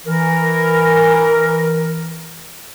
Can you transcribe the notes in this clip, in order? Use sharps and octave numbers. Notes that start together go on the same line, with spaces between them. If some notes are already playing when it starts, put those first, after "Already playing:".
E3 A#4